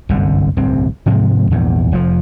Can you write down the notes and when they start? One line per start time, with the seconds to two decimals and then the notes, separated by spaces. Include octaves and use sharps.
0.09 G1 C2 F#2 D3
0.57 D1 C2 G2 C4
1.06 G#2 C3 F3 G#3
1.51 A#1 E2 G#2
1.92 F1 F2 C#3 F3